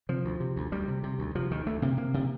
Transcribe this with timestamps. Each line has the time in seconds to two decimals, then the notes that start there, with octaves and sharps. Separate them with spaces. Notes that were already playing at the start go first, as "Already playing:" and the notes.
0.09 C3 F3
0.25 D2
0.40 C3
0.56 D2
0.72 D2 G3
0.88 C3
1.03 C3
1.19 D2
1.35 C3 F3
1.51 D2 D#3
1.66 D2 A3
1.82 C3 A#3
1.97 C3 A#3
2.14 C3